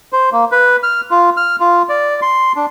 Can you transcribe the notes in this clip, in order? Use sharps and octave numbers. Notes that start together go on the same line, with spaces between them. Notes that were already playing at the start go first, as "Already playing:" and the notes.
C5
A#3
B4
F6
F4
F6
F4
D5
C6
D4